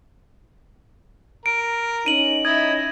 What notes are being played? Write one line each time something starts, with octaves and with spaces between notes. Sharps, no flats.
A#4 D7
C#4 D#4 D#7 F#7
E4 D#5 G#6